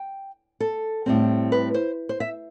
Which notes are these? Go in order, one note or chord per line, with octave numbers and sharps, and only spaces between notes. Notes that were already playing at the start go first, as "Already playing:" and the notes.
Already playing: G5
A4
A2 G3 C4
B4
C5
C5
E5